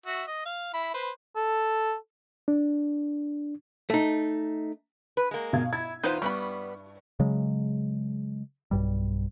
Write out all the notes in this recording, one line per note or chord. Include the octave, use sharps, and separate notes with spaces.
F#4 E5
D#5
F5
E4 B5
B4 C5
A4
D4
A3 D#4
B4
G#3 A#3
B2 F5 G#6
E4 G#6
E2 D#4 F4 B4 C5
G2 G3 B3 B5 C#6
C#3 F#3 G#3
B1 G2 G3